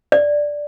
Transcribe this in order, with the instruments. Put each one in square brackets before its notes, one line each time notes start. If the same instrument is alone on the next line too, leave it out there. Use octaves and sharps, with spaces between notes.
[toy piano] D5